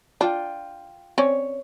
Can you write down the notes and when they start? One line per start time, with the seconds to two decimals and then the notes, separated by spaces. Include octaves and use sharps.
0.21 D4 F4 G5
1.18 C4 C#4 C#5 D5